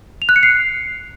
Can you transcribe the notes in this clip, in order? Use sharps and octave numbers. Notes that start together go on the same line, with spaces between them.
F7
F#6
C#7
C7